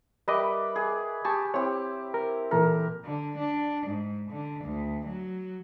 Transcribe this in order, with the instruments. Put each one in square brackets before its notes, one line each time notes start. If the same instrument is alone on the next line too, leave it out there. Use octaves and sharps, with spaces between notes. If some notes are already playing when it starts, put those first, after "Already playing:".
[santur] G3 B4 D6 [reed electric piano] A#4 D#5 E5
[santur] G#4
[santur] G4 [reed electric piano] G#5 A5 C#6
[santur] C4 E4 G4 [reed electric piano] C#5
[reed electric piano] A#4
[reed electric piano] A#2 E3 A4 [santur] A#4
[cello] D3
D4
G#2
D3
D2
F#3